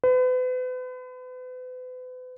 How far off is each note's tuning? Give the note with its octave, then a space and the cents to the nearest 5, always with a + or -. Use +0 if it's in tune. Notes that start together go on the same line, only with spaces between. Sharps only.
B4 +40